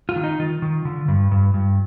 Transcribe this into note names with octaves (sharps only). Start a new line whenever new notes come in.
F4
D#3
D#4
D#3 F4
D#3
D3
G2
G2
G2